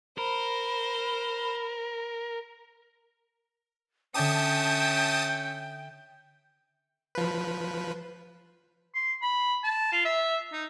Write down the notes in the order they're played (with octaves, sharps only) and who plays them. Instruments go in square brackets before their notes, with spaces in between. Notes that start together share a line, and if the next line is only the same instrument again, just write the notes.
[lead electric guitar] A#4 [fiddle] C5 [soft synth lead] B5
[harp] D3 C#5 D6 [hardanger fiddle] C#4 E5 [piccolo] G5 [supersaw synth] A5 D#6
[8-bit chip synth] F3 B4
[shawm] C6
B5
A5
F4
E5
D#4